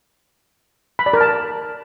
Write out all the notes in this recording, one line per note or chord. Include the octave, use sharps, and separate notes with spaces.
B5
D5
A#4
A5